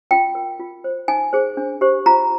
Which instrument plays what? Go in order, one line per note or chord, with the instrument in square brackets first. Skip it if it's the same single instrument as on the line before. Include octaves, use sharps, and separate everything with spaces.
[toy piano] F4 G5
A#4
F4
C5
D#4 G#5
G#4 C5
D4
G4 C5
F4 A#5